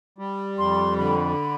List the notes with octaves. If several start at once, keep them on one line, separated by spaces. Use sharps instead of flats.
G3
F2 C6
D3 B5